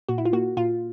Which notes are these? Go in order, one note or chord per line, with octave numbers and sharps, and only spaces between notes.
A#2 F#4
E4
F4
A#3 F#4
A#2 F4